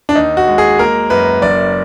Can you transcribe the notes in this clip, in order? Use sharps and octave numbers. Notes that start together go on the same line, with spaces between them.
D4
D#2 D#4
F#4
G#3
G#4
A#3 A#4
F#2 B4
F#1 D5